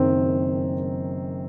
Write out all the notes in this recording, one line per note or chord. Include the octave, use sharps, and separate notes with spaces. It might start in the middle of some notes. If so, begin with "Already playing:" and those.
Already playing: F#1 F#2 D#3 C4